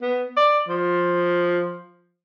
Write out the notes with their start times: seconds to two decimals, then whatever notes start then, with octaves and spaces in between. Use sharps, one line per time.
0.02 B3
0.37 D5
0.69 F3